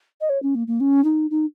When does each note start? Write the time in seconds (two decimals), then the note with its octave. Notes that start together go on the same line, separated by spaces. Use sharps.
0.21 D#5
0.30 C#5
0.43 C#4
0.55 A#3
0.68 A#3
0.80 C#4
1.04 D#4
1.30 D#4